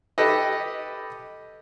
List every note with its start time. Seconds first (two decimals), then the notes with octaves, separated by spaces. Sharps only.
0.18 G4 A4 B4 D#5